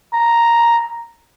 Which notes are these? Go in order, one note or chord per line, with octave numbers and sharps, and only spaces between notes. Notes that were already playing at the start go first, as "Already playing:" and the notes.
A#5